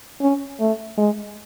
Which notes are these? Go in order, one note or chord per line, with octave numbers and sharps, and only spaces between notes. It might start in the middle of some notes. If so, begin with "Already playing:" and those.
C#4
A3
G#3